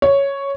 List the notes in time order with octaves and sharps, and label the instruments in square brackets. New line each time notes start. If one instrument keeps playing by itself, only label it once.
[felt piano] C#5